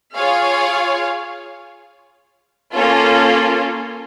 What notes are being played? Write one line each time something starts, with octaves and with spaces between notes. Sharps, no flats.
F4 G#4 C#5 F5
A#3 C#4 F4 A4